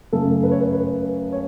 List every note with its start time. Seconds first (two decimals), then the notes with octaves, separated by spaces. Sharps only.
0.12 F#2 C#3 A3 A4
0.43 B4
0.51 C#5
0.61 B4
0.73 B4
1.32 C#5